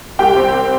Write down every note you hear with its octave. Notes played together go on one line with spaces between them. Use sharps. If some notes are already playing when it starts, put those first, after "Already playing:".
C2 G4 G5
C4